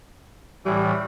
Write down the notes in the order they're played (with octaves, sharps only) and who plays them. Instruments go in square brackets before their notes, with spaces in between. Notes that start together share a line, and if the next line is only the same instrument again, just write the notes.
[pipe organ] A2 E3 [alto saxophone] G3